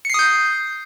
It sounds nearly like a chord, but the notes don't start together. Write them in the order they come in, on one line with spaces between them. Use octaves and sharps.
C#7 C7 D#6 G6